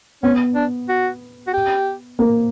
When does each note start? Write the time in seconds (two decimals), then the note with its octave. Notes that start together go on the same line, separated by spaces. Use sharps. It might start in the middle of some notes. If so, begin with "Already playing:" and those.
0.23 B3 C#4
0.55 D4
0.89 F#4
1.47 F#4
1.54 G4
2.19 A#3